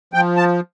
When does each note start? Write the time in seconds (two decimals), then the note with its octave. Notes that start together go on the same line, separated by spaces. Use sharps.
0.14 F3 G5
0.37 A5